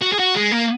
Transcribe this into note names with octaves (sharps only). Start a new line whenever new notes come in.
F#4
G#4
F#4
G#3
A#3